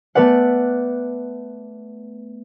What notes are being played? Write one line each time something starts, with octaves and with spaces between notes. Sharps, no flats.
A3 B3 B4 D5 F#5